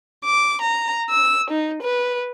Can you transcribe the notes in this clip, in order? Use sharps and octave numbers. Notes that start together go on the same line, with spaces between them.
D6
A#5
E6
D#4
B4